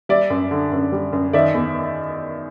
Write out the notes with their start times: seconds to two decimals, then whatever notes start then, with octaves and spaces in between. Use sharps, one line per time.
0.09 G3 D5 E5
0.30 F#2
0.51 D3
0.72 F#2
0.92 G3
1.13 F#2
1.33 D#3 D5 E5
1.54 E2